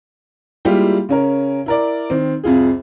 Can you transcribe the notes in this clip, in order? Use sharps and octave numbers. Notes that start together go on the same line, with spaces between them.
G3 G#3 A#3 E4 F4 G4
C#3 C#4 A#4
E4 A#4 D5
D#3 C4
C2 F2 F4 G#4